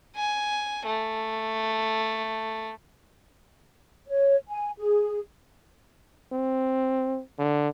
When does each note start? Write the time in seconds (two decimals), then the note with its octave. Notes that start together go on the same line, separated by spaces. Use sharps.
0.16 G#5
0.86 A3
4.08 C#5
4.49 G#5
4.78 G#4
6.32 C4
7.39 D3